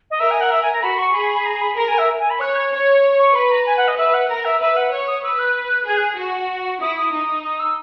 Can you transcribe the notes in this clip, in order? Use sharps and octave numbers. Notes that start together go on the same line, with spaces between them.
D#5
A#4 E5
G#5
F#5
E5
G#5
A#5
F#4 B5
C#6
G#4 B5
B5
A#5
B5
A#4 A#5
G#5
E5
G#5
B5
C#5 F#6
G#6
C#5
C#6
B4 B5
A#5
G#5
F#5
D#5
B4 E5
F#5
A#4 A#5
E5
B4 E5
F#5
C#5
D#6
B4 E6
F#6
G#4 G#6
F#6
F#4
E4 D#6
D#6
D#4
D#6
E6